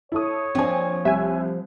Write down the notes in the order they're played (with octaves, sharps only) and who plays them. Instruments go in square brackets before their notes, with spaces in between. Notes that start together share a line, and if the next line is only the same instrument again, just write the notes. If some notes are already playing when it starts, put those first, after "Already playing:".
[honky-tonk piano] E4 A4 D#6 [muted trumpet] C#5
[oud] F3 A#3 [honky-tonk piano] C4 D4 G#5
[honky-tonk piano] C2 [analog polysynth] E5 G#5